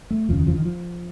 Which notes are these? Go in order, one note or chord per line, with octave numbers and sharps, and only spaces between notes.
A3
F1 D#2 C#3 F3
D#3
F3
D#3
F3